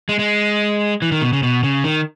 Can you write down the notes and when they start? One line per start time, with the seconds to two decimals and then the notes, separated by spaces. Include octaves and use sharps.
0.09 G#3
0.19 G#3
1.02 E3
1.12 D#3
1.22 B2
1.33 C#3
1.43 B2
1.63 C#3
1.84 D#3